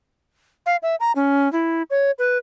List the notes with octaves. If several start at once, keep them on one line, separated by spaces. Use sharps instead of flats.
F5
E5
A#5
C#4
E4
C#5
B4